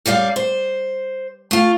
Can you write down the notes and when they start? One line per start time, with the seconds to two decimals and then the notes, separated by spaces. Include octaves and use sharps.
0.06 F#2 G3 D5 F5
0.36 C5
1.51 A3 F4